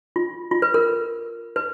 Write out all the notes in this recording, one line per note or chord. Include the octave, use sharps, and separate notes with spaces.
F4
F4
B4
A#4
B4